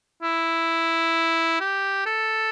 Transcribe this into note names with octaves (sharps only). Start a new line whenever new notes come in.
E4
G4
A4